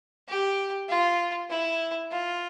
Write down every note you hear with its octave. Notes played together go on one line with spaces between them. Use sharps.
G4
F4
E4
F4